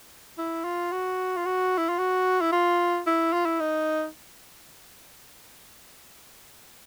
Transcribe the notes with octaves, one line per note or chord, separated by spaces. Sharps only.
E4
F4
F#4
F4
F#4
E4
F4
F#4
E4
F4
E4
F4
E4
D#4